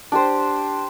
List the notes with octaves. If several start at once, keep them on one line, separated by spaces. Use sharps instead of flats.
D4 G4 C5